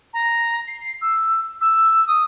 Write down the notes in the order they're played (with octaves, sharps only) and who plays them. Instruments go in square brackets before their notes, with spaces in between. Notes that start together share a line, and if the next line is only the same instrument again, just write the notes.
[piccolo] A#5
C7
E6
E6
D#6